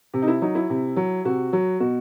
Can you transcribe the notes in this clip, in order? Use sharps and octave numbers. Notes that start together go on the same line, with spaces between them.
C3
D#4
E4
F#3 D#4
E4
C3
F#3
C3 F#4
F#3
B2 F#4